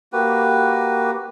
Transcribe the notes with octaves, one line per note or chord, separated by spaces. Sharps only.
A#3 F#4 G4 B4